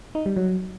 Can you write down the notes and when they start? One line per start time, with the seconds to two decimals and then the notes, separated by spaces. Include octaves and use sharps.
0.15 D#4
0.26 G3
0.36 F#3